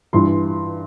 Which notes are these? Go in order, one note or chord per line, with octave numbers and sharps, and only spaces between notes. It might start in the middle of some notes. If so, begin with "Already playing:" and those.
G2 E3 C6